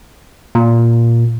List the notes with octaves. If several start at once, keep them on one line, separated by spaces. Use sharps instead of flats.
A#2